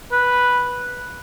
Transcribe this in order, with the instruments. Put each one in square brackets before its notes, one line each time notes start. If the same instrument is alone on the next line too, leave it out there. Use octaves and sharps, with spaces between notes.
[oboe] B4